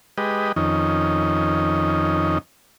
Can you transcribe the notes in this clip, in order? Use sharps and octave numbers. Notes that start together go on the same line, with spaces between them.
G#3 G4 B4 D#5
F2 D#3 C#4 D#4